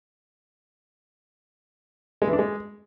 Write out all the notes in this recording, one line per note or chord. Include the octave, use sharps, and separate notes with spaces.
G#3
E3
D4
G#3